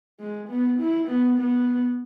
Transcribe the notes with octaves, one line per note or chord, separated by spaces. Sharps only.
G#3
B3
E4
B3
B3